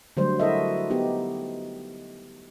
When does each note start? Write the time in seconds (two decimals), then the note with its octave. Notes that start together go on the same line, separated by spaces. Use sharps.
0.17 D3 F#3 G3 A3 C5
0.40 E4 F#4 A4 A#4 D#5 E5
0.90 B3 D#4 G4